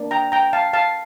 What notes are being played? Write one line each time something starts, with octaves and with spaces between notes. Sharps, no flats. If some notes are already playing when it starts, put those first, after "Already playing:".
Already playing: A#3 D4
G5 A#5
G5 A#5
F5 A5
F5 A5